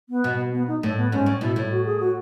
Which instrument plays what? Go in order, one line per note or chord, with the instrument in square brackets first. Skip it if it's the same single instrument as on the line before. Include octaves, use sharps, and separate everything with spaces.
[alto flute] B3
[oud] B2
[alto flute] B3
D#4
[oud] A2 [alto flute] A3
[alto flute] B3
[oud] G#2 [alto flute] C#4
[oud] A2
[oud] B2 [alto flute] E4
[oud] A2
[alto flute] F#4
G#4
F#4